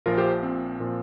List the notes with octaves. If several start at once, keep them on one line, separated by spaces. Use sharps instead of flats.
A#1 A#2 F3 F4 A#4
G4 C5
C4
A#2 F3